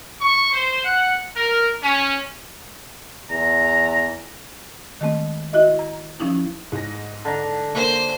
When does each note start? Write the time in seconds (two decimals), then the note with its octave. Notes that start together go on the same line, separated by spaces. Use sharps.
0.21 C#6
0.53 C5
0.84 F#5
1.36 A#4
1.83 C#4
3.31 E2 A#5
5.01 D#3 G#3 A3 C4
5.53 E4 F#4 D#5 E5
5.79 A#5
6.20 F3 C#4 D#4 E4
6.72 G#2 A#6
7.25 D3 A#5
7.75 A#3 C5